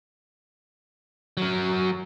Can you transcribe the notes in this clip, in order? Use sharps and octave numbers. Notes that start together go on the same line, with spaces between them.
F#3 A#4